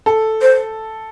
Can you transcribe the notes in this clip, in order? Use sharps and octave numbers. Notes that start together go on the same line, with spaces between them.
A4
C5